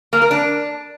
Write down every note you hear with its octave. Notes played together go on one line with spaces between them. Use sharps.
A#3
A#4
D4